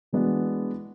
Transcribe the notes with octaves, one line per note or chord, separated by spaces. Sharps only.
E3 G#3 B3 D4 F#4